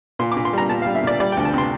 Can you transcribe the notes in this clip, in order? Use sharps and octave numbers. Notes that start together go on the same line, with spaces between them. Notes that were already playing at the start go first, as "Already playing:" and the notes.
A#2 C6
D6
A#2
C6
G3 A#5
A#2 A5
G3 F5
E5
A#2 D5
G3 D5
D2 G5
A5
C3 C6